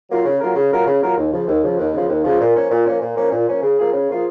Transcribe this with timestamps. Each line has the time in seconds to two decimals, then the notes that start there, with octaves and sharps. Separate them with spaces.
0.09 F#3 A#3 F4 A#4
0.25 C#3
0.41 F#3 A#3 F4 A#4
0.55 C#3
0.71 F#3 A#3 F4 A#4
0.86 C#3
1.01 F#3 A#3 F4 A#4
1.17 D#2
1.32 C#3 F3
1.47 D#2
1.63 C#3 F3
1.78 D#2
1.93 C#3 F3
2.09 D#2
2.24 C#3 F3
2.40 A#2
2.56 F3 A#3 C#4
2.71 A#2
2.86 F3 A#3 C#4
3.01 A#2
3.16 F3 A#3 C#4
3.32 A#2
3.48 F3 A#3 C#4
3.62 C#3
3.78 F3 A#3 F4 G#4
3.93 C#3
4.09 F3 A#3 F4 G#4